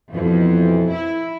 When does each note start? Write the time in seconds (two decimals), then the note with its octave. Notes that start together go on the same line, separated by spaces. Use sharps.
0.12 F2 B2 E3 F3
0.92 E4